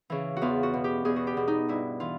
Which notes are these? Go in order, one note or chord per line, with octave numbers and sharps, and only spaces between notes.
C#3 E3
F#4
E2 F4
F#4
B2
G4
E2 G#4
F#4
G4
B2
D#4
G2 E4
E3 F4